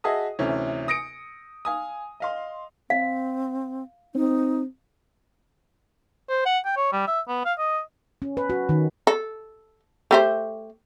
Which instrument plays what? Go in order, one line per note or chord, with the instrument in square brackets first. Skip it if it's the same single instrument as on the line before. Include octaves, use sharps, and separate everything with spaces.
[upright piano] F#4 G#4 D#5 E5 A5 D#6
D2 C3 E3 C#4
D#6 A#6 C#7 D7
F5 G#5 D#6
D#5 F5 C6
[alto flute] C4 [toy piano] F5
[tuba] C4 [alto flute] D#4
[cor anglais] C5
F#5
G5
C#5
G3
E5
B3
F5
D#5
[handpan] C#4
B4
F#4
D#3
[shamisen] A4
A3 G4 C5